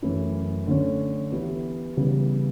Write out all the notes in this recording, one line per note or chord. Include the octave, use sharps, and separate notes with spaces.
F#2 E3 A3 C#4 E4
D3 A3 C#4
E3 B3 E4 G4
C#3 E3 G3 B3